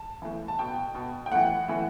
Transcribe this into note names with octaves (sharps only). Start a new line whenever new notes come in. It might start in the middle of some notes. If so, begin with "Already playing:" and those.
Already playing: A5
A2 E3
A5
B2 G5
B2
G5
A2 E3 F#5
A2 E3